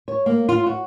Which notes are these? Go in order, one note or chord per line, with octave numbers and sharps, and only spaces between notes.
C#5
A#3
F4
F#4